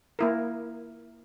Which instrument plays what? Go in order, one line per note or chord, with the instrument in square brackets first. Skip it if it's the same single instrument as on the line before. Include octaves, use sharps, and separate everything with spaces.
[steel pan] A#3 E4 A#4